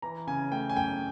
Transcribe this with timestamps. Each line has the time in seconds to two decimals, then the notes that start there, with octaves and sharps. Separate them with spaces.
0.02 E3 A#5
0.27 C#3 G#5
0.51 A3 G5
0.69 G#5
0.76 F#2 G5